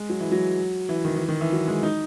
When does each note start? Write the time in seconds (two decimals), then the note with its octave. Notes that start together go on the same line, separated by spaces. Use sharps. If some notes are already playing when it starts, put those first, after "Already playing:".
Already playing: G#3
0.10 F#3
0.20 E3
0.32 F#3
0.89 E3
1.05 D#3
1.16 E3
1.29 D#3
1.41 E3
1.52 F#3
1.67 G#3
1.83 D#4